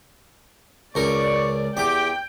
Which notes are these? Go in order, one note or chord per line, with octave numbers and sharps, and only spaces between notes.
C#2 A#4 D5 C#6
E2 G4 G5 D6